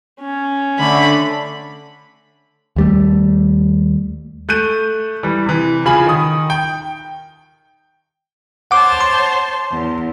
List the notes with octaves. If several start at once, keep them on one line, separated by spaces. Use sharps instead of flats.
C#4
D3 A3 B5
D#2 G3 A3
A3 F#6 G6 D#7
E3 G3
C3 E3
C#3 F3 G#5 B5 F#7
D#3 D#6
G5
C5 C#5 F#5 A5 D6
C6
E2